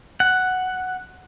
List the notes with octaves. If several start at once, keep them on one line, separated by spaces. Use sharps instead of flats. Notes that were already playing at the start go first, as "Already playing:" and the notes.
F#5